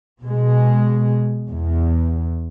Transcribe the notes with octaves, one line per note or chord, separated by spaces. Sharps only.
B2 G#3
E2